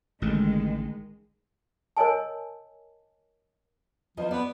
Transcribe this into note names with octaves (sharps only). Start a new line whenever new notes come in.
A1 D3 D#3 G#3
A#4 C#5 D#5 G#5 A5
E2 E3 F3 D#5
B3 D5